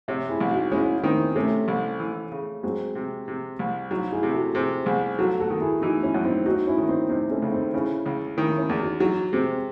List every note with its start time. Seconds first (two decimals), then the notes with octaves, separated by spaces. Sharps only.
0.08 C3 C#5 E5
0.29 E4 G#4
0.40 C2
0.51 D#4 F#4
0.72 G#3 C#4 E4
0.98 E4
1.04 D#3 C4 D#4
1.35 C3 A3 C#4
1.68 C2
2.00 E3
2.32 C#3
2.63 F#3 G#3 C4
2.95 C3
3.28 C3
3.59 C2
3.90 F#3 D#4 F#4
4.12 E4 G#4
4.23 C3
4.33 F#4 A4
4.55 C3 G#4 C5
4.86 C2 G#4 C5
5.19 F#3 F#4 A4
5.40 F#4 A4
5.50 D#3
5.60 E4 G#4
5.82 E3 D#4 F#4
6.03 C#4 E4
6.14 F#2
6.24 C4 D#4
6.46 F#3 D#4 F#4
6.67 C#4 E4
6.78 D#3
6.89 C4 D#4
7.09 C3 C4 D#4
7.30 A3 C#4
7.42 C#2
7.52 C4 D#4
7.73 C#3 C#4 E4
8.06 C#2
8.37 D#3 C#4 E4
8.58 C#4 E4
8.69 E2
8.80 D#4 F#4
9.00 F#3 D#4 F#4
9.32 C3 G#3 C4